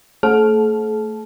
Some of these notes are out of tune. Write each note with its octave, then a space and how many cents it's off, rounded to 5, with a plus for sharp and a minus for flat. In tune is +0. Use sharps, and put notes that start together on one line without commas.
A3 +25 A4 -45 A5 -20